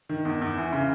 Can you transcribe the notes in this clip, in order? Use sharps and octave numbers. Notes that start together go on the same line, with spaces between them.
D#3
E2
E2
E3
C#3